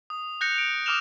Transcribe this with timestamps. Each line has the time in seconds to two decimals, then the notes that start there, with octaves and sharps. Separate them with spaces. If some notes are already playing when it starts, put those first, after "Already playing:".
0.10 D#6
0.41 F#6 G6 A#6 C#7 F7
0.58 D7
0.86 D6 D#6 F6 E7 F7